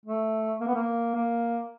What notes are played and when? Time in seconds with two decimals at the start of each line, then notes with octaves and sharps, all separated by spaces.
0.06 A3
0.60 A#3
0.67 B3
0.75 A#3
1.15 A#3